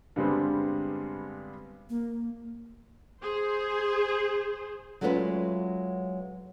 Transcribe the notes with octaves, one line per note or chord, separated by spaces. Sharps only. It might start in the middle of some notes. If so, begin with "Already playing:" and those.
G2 D3 G3 G#3 B3 C4
A#3
G#4 C5
F#3 G#3 A3 C#4 F4 B4